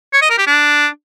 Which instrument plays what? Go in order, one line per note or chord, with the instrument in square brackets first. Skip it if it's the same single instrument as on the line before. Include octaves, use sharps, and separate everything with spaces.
[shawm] C#5
D#5
A#4
G4
D4